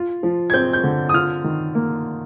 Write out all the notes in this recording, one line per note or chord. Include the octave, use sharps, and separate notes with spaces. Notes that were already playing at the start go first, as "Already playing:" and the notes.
Already playing: F4
F3
G#6
C4 G6
G6
D3
D#6
F4 F6
D#3
A#3